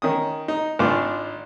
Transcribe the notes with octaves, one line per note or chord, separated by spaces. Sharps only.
D#3 C#4 D#6
D#4
G#1 D4 F4 D6